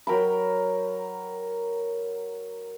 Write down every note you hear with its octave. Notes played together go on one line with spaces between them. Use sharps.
F#3 A#4 G5 B5